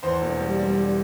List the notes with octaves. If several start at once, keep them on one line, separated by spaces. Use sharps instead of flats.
E2 C5 C6
E1
G3
G3
G3